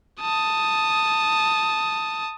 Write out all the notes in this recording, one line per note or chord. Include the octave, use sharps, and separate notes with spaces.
A5 D#6